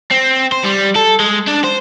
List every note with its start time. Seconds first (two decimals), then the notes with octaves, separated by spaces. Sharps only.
0.11 C4
0.52 C5
0.64 G3
0.96 A4
1.20 G#3
1.48 D4
1.64 C5